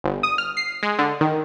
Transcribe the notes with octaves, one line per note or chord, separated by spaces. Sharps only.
G1
D#6
F6
C7
G#3
D3
D#3